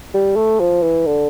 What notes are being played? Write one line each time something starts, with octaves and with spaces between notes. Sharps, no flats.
G3
A3
F3
E3
D3